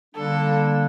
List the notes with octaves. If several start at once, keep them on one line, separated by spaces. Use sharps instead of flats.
D3 G3 A#3 D4 A4